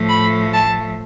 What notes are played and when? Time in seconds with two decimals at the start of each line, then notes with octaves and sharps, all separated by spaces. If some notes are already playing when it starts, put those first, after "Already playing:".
Already playing: A2 F3 A3
0.08 B5
0.53 A5